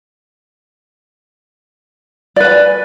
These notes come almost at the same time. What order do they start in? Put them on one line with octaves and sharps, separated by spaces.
D5 B4 G#5